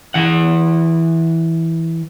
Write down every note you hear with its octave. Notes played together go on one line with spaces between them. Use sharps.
E3 F#5